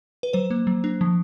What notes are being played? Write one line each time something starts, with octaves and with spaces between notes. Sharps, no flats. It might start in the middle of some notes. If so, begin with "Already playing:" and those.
B4
F#3 C5
A#3
F#3
D4
F3